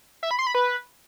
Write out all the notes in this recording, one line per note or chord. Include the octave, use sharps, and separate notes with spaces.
E5
B5
C6
B5
B4